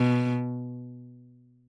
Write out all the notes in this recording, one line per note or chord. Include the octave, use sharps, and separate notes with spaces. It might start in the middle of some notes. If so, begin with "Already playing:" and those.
Already playing: B2